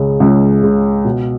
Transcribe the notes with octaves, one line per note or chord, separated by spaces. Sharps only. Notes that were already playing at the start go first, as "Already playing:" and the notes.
Already playing: C#2 C#3 G#3
C#2
C#3 G#3
B2